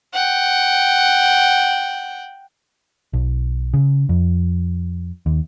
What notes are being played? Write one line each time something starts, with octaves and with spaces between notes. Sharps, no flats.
F#5 G5
B1
C#3
F2
D#2